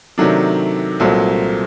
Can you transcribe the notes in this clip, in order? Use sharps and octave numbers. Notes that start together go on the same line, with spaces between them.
C3 D#3 F#3 A3 D4
C2 A#2 F#3 A3 C4